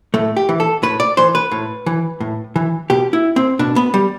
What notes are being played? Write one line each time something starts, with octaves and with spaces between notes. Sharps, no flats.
A2 A3
G4
E3
A4
A2 B4
D5
E3 C5
B4
A2
E3
A2
E3
B2 G4
E4
C4
B2 D4
B3
G3